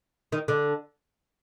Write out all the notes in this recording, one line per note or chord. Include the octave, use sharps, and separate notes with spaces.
D#3 D#4
D3 D4